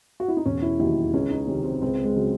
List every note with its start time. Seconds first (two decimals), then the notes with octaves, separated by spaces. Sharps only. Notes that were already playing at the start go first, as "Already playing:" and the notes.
0.20 F#4
0.28 E4
0.37 D#4
0.45 E1 C#4
0.62 E4
0.79 D#2 D#3 F#3 E4
1.14 C#2 C#4
1.31 D#4
1.48 C3 D#3 F#3 C#4
1.64 C4
1.82 C#2 C4
2.04 G#3
2.16 C#3 F#3